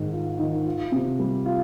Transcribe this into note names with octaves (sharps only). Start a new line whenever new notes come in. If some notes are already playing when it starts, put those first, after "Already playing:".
Already playing: G#2 D#3
F4
D#3
F4
C3
G3
F4